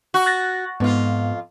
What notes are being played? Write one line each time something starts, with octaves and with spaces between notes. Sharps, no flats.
F#4
F#6 A6 A#6
F2 G#2 B3 F4